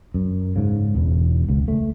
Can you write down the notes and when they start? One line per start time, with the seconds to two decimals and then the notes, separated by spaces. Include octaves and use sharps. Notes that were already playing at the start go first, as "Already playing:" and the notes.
0.14 F#2
0.56 G#2 C#3
0.95 E1 E2
1.48 C#2
1.68 A3